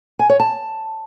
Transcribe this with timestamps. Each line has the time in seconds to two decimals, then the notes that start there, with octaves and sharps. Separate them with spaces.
0.19 G#5
0.29 C#5
0.40 A5